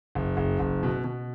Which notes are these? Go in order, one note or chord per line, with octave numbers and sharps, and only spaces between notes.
F#1
F#1
F#1
B2
B2